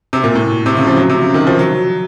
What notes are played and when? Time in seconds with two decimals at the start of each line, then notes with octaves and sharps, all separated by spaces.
0.13 C3
0.24 A#2
0.35 A2
0.66 C3
0.77 C#3
0.87 F3
0.97 F#3
1.09 C3
1.22 C#3
1.34 D#3
1.47 F3
1.59 F#3